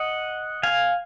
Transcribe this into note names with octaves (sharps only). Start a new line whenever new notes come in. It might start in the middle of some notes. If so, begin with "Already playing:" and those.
Already playing: D#5 F#5
F5 G#5